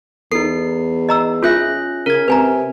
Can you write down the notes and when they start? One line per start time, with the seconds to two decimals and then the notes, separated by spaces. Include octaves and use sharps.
0.32 E2 D#4 A4 C7
1.09 D#5 A#5 E6
1.43 C#4 F4 G#4 E5 F#6 A#6
2.06 C#3 A#4 G#6
2.28 C3 B4 G#5 A#5